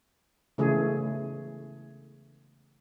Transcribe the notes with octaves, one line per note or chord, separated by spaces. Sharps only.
C#3 E3 A3 G#4